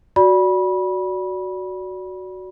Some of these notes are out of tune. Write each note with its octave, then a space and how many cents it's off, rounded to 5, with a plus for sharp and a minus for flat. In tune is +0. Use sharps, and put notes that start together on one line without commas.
F#4 +0 D5 -15 B5 -25